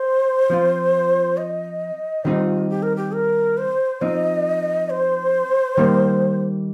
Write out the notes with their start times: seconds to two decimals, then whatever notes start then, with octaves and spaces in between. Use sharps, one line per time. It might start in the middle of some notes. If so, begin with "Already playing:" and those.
Already playing: C5
0.50 F3 C4 F4
1.37 D#5
2.25 D#3 G3 C4 D#4 F4
2.70 G4
2.83 A#4
2.96 G4
3.14 A#4
3.58 C5
4.01 F3 C4 D#4 D#5
4.90 C5
5.77 D#3 G3 A#3